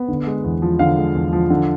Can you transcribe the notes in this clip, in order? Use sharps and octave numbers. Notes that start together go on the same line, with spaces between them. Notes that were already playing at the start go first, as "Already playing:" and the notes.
Already playing: B3
D3
G#3
E2
F3
D3 F5
G#3
E2
F3
D3